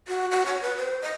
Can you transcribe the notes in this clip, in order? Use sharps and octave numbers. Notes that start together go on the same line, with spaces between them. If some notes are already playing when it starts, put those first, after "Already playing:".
F#4
F#4
C#5
B4
C5
D#5